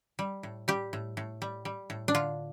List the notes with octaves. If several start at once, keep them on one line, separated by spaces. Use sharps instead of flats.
G3
A2
G3 G4
A2
A2
G3
G3
A2
D4
D3 F4